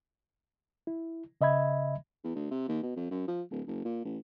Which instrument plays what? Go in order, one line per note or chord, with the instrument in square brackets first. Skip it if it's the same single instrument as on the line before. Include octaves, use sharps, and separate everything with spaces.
[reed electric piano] E4
C#3 D#5 E5 B5 G#6
[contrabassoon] E2
D2
C3
D#2
B2
F2
F#2
F3
D1
F#1
A#2
A1